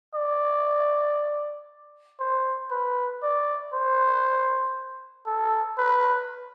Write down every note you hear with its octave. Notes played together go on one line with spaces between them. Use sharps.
D5
C5
B4
D5
C5
A4
B4